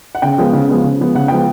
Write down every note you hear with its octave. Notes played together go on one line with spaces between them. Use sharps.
F#5
C#3 G5
F3 G#3 B3
C#3
F3 G#3 B3
C#3
F3 G#3 B3
C#3 F#5
F3 G#3 B3 G5